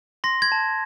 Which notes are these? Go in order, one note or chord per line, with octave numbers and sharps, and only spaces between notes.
C6 A#6
G#6
A5